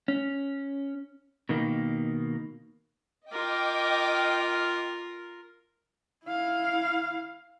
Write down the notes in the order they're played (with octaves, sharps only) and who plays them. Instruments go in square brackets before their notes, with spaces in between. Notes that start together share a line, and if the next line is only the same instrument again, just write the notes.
[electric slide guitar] C#4
B2 D#3 A#3
[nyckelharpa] F4 A#4 [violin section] D#5 G5 D6
[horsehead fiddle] E4 F5